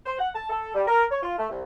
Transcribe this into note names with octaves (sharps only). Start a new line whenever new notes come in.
C5
F#5
A5
A4
G3
A#4
C#5
F4
A3
C2